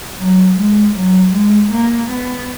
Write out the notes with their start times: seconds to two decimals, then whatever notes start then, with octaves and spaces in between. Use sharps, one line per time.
0.19 F#3
0.57 G#3
0.95 F#3
1.34 G#3
1.72 A#3
2.10 B3